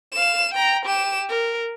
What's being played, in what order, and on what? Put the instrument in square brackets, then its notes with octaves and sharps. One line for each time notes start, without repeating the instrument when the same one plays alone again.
[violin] F5 E7
G5 A#5
G4 E7
A#4